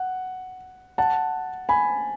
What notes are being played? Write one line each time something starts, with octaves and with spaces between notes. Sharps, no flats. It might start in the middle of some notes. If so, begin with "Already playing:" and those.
Already playing: F#5
F#5 A5
G#5 B5